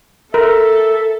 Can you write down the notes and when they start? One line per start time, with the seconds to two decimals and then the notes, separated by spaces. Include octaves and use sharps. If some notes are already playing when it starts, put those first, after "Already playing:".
0.34 A4 A#4 E5